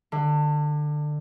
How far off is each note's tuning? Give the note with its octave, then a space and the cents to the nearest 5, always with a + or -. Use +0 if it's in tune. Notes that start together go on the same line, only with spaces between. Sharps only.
D3 +25